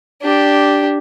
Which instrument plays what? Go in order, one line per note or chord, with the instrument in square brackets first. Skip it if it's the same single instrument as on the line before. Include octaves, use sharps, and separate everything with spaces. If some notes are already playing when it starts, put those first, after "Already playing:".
[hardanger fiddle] D4 G4